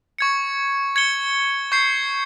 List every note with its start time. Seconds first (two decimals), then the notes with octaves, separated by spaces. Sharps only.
0.18 C#6 G#6 C#7
0.96 G#6 C#7 G7
1.72 C#6 G6 C7